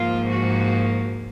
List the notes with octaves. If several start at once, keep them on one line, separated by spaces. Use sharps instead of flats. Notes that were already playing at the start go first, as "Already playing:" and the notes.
Already playing: G#2 F3 A#3 F4
F#4